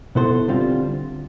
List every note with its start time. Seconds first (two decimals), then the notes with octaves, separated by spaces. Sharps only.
0.15 B2 B3 E4 A4 C5
0.48 D3 G3 C4 F4